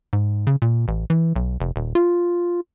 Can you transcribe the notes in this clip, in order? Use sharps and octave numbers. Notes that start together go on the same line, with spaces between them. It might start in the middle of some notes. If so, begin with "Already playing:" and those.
G#2
C#3
A#2
A1
E3
B1
F1
D#1
F4